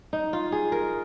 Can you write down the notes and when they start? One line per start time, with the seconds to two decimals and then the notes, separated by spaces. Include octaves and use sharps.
0.13 D#4
0.33 F4
0.52 G#4
0.72 A#4